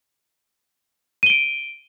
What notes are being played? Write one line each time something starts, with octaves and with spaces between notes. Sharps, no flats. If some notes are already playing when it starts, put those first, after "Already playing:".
D7 D#7 G7